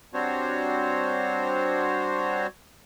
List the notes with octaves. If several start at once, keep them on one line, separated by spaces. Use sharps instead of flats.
G3 C4 D4 F#4 C5 C#5